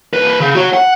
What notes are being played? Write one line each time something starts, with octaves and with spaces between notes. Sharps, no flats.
C2 B4
C#3
F#4 C#5
F#5